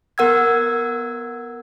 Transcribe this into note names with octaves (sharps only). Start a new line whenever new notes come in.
B3 A#4 F#5 E6 G#6